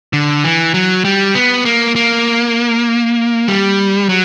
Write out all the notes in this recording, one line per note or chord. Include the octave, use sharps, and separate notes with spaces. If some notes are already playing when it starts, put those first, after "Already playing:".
D3
E3
F#3
G3
B3
A#3
A#3
G3
F#3